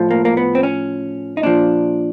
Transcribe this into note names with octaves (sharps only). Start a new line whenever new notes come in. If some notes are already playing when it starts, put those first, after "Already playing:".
Already playing: A2 F3
A#3
A#3
B3
C4
C#4
D#4
A#2 F3 D4